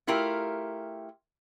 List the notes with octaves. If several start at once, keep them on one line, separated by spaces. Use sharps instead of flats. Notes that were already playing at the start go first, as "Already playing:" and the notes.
A3 E4 F4 G4 A#4